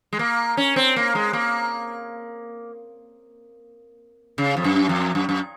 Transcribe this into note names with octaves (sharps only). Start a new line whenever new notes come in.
G#3
A#3
C#4
C4
A#3
G#3
A#3
C#3
F2
F#2
F2
F#2
F#2